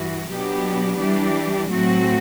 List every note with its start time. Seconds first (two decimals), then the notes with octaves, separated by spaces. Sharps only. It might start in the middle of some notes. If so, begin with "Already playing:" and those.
Already playing: G2 E3 F#4
0.28 B2 F#3 B3 D4 G4
0.98 E3 G3 D4 G4
1.69 A2 F#3 A3 C4 F#4